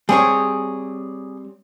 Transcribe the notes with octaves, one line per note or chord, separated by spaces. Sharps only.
G3 C4 G#4 C#5